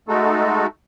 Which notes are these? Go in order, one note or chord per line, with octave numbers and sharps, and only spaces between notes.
G#3 A3 D#4 F#4 A4